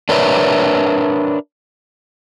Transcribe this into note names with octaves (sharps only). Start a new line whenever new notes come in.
D4 A#4 B4 C#5 E5